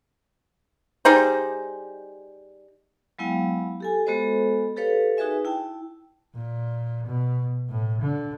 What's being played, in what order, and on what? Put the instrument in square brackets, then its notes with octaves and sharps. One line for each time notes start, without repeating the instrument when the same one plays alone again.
[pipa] G3 D#4 G#4 C5
[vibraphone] F#3 G#3 B3 E4 F5 G5
G4 A4 G#5
G#3 B3 F#4 A4 C5 D#5
G4 A4 B4 C#5 F5
D#4 F#4 G#4 B4 E5 G#5
E4 G5 A5
[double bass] A#2
B2
A2
D3